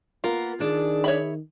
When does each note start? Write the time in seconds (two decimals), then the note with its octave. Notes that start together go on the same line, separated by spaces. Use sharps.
0.24 A#3 B3 F4 A#4
0.60 D#3 D4 G#4 D5
1.04 C#5 E5 B5